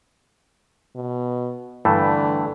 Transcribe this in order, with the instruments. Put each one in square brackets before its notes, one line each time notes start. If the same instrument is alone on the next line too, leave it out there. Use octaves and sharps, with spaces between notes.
[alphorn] B2
[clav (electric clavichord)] G2 E3 A3 [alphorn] D3